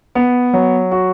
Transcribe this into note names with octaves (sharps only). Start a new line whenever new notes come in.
B3
F#3
F#4